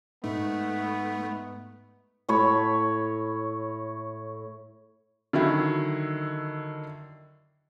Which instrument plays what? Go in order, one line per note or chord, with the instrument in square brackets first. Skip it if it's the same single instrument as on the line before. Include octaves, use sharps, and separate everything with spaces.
[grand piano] G#2 [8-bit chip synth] A3 [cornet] B3
[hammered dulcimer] A2 C#5 B5
[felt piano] D3 D#3 F#3 E4